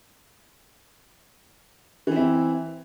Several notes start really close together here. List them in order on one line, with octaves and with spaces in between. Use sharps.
E3 C4 E4